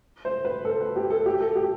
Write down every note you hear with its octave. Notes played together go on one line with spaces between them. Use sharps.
C5
B4
A4
B4
G4
A4
G4
A4
G4